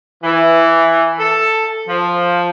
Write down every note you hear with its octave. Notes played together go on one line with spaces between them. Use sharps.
E3
A4
F3